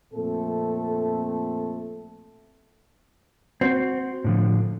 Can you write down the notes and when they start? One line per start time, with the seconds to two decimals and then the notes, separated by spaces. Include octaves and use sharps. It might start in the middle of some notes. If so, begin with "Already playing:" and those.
0.14 F2 A#2 A3 C4 A4
3.61 C4 F#4
4.24 A2 D3 F3